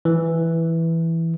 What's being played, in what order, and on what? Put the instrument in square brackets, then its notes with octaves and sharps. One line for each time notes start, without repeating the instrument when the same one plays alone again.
[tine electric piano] E3